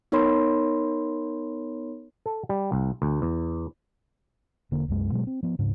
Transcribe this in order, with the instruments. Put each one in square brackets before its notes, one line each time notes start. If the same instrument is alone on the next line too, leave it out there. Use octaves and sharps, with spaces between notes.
[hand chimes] B3 D#4 A#4 C#5 B5 C6
[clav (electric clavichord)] A4
G3
C2
D2
E2
[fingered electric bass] E1 D3 A#3
C2 F#2 G#3
B2 F#3 G#3
C4
F3 B3
D1 G#2 C#3 D4